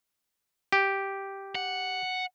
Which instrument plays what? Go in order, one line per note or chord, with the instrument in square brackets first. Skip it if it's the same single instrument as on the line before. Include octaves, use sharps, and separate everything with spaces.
[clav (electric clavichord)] G4
[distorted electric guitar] F#5